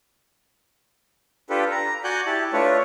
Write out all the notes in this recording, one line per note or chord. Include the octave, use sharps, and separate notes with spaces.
D4 F4 G4 A4 B4
A#5
F#4 D5 F#5 G#5 F#6 G6
E4 G4 A5
A3 D4 F4 B4 C#5